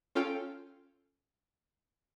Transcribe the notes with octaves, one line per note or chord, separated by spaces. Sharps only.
C#4 F4 A4 F5 G5